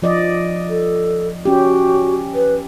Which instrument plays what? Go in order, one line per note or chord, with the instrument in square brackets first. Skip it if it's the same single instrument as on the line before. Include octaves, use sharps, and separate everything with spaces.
[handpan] F3 D5 D#5
[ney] A4
[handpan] C#4 G4 [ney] F#4
[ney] B4